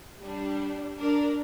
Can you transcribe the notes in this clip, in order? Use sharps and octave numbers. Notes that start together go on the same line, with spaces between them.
G3 D4
D4 A#4